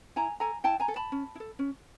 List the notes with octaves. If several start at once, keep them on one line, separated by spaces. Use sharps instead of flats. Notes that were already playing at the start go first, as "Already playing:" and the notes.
E4 G#5 A#5
A4 G#5 A#5
E4 G5 A5
G#5 A#5
A4
A5 B5
C#4
E4
A4
C#4